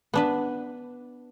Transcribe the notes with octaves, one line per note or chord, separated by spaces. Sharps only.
B3 D4 B4